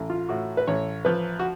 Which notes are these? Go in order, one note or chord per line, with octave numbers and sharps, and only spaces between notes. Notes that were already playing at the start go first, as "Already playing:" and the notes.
Already playing: A1
F4
A2 F#4
B4
A1 C#5
F3 B4
F#4